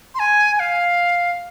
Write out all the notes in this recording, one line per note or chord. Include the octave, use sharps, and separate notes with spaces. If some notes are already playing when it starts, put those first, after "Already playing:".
C6
G#5
G#5
F5